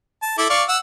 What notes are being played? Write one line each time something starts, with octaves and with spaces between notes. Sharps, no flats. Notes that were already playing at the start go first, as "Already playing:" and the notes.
A5
E4 A4 D6
D5 F5 C#6
F#5 E6